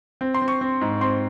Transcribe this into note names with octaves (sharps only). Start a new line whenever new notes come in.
C4
C6
C4
C#6
C4
G#2
C4 C6